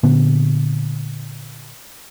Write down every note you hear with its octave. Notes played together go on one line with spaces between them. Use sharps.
A#2 D3 B3